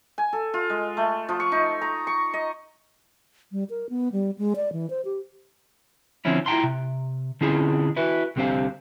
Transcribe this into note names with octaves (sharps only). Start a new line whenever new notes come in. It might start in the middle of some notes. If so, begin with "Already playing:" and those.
G#5
A4
F4
G#3
A3
F3
C#6
D#4
A#5
C#6
D#5
G3
A#4
B3
G3
G#3
D5
E3
C5
G4
D3 F3 C4 C#4 E4
E4 F4 G5 A#5 C6
C3
D3 C4 C#4 E4 F4 G#4
E4 F#4 B4
C2 D3 C4 G4 C5 F5